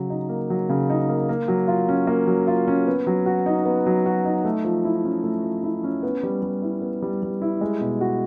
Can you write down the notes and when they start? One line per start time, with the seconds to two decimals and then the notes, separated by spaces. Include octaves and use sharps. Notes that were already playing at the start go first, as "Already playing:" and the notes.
Already playing: C#3 F#3
0.10 D#4
0.29 A#3
0.50 F#3
0.69 C#3
0.90 D#4
1.09 A#3
1.29 A#3
1.48 F#3
1.68 F4
1.89 C#4
2.07 A#3
2.27 F#3
2.47 F4
2.68 C#4
2.87 B3
3.07 F#3
3.26 F#4
3.46 D#4
3.65 B3
3.86 F#3
4.06 F#4
4.25 D#4
4.45 A3
4.64 F3
4.85 E4
5.04 C#4
5.24 A3
5.44 F3
5.64 E4
5.84 C#4
6.03 B3
6.23 G3
6.42 G3
6.62 E4
6.82 B3
7.02 G3
7.22 G3
7.42 E4
7.61 G#3
7.81 B2
8.01 F#4